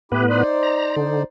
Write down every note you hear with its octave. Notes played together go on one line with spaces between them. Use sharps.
A2 B3 E4 G4 B4
D#4 C5 D5
A#5
D3